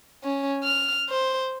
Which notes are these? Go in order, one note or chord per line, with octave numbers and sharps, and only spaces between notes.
C#4
F6
C5